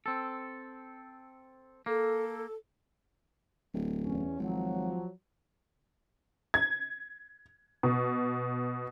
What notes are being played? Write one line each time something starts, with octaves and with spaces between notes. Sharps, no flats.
C4 A4
A#3 A4
D1
E2 C#4
G#1 F3 F#3
G#6
B2